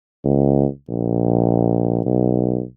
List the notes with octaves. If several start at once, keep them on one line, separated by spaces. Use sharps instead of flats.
C#2
A#1
B1